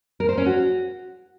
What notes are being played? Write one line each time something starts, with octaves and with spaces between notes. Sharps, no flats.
A#4
C5
C#4
F#4